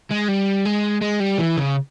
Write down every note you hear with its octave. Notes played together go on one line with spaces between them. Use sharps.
G#3
G3
G#3
G#3
G3
E3
C#3